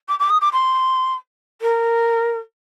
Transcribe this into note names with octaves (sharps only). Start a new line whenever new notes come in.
D6
D6
D#6
D6
C6
A#4